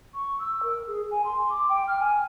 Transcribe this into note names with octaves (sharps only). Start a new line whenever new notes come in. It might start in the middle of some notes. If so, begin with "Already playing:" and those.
C#6
E6
A#4
G#4
G#5
C6
D6
G5
F6
G#5